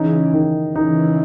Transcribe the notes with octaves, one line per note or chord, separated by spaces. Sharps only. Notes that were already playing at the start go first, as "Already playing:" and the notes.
Already playing: C#3 E3 D#4
D#3
C#3 E3 D#4